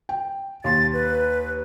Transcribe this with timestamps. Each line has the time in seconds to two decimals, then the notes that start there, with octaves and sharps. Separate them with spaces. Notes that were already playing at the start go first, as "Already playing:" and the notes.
0.09 G5
0.64 D#2 C6 A6
0.93 B4